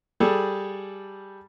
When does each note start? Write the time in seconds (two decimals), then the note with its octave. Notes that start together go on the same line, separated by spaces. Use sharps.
0.20 G3 G#4 A4